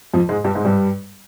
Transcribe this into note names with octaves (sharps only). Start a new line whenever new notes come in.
F2 F3
G#2 G#3
G2 G3
G#2 G#3
G2 G3